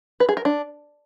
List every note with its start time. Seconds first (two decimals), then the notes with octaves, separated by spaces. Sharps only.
0.20 B4
0.29 G#4
0.37 A#4
0.45 D4